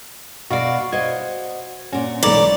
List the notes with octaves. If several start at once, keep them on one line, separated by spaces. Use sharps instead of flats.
B2 F#4 D5 F5
F#4 C5 D#5 G#6
A#2 C#4 F#4
B1 G#2 E3 A3 C#5 D5 A#5